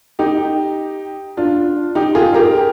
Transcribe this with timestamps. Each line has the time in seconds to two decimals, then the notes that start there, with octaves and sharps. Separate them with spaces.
0.19 D#4 G4
1.37 D4 F4
1.95 D#4 G4
2.15 F4 G#4
2.34 G4 A#4